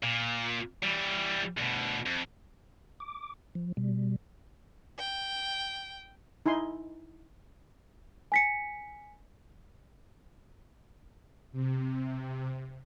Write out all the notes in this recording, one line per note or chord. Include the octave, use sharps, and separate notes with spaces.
A#2
E3 G3
D2 B2
F2
D6
F3
B2 G3
G5
D#4 E4 G#5 C6
G#5 B6 C#7
C3